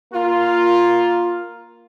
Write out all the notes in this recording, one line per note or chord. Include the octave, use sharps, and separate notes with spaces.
A#3 F4